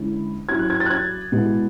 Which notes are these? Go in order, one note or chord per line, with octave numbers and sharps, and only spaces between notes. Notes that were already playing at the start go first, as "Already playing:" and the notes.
Already playing: D3 G#3 C#4 E4
F#3 C#4 E4 G#6
F#6
G#6
A6
F#6
G#6
B2 G#3 B3 E4